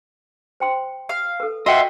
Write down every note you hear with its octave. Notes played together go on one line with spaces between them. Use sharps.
C5 G5 C6
F5
A4 B4
F#4 D#5 E5 F#5 G5 C6